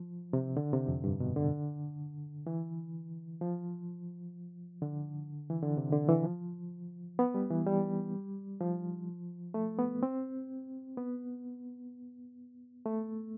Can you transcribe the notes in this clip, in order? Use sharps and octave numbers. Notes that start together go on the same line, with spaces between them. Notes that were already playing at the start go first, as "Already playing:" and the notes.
Already playing: F3
C3
D3
C3
F2
G2
B2
D3
E3
F3
D3
E3
D3
C3
D3
E3
F3
B3
G3
E3
G3
F3
A3
B3
C4
B3
A3